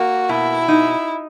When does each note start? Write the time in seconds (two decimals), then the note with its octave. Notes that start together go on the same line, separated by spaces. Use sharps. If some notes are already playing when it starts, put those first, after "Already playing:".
Already playing: A#3 F#4
0.29 B2 E4
0.68 D#4